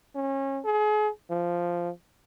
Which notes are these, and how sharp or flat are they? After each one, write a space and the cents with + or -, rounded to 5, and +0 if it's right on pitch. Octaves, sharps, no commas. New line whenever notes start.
C#4 -30
G#4 +35
F3 -5